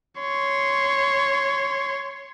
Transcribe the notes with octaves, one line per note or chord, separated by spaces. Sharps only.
C#5 C6